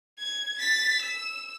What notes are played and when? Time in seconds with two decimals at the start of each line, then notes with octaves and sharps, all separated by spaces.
0.19 G#6
0.59 A6 B6
1.02 E6